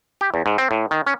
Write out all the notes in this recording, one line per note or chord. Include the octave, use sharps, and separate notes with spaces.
G4
E2
G#2
C4
A2
D#3
C#4